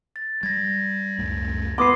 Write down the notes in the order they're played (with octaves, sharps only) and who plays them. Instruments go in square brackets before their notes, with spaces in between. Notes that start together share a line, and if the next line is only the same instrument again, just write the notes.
[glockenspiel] A6
[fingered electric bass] G3 [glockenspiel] G#6 A#6
[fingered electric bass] C#2 F#2 A2
[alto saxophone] B3 [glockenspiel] C6 D#6 C7 [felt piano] D6